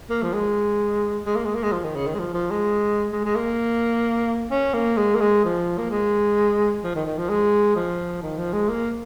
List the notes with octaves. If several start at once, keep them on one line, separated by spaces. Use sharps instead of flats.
A#3
F3
G#3
G#3
A#3
G#3
A#3
G#3
F3
D#3
C#3
D#3
G#3
F3
F3
G#3
G#3
G#3
A#3
C#4
A#3
G#3
A#3
G#3
F3
A#3
G#3
F3
D#3
D#3
F3
G#3
F3
D#3
F3
G#3
A#3